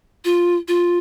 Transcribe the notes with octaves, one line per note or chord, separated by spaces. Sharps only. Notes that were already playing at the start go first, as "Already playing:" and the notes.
F4
F4